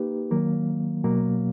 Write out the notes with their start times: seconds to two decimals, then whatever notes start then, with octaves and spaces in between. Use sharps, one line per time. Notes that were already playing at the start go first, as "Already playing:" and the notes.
Already playing: A#3 D#4 G4 B4
0.31 D#3 F#3 A#3
1.04 B2 F#3 A#3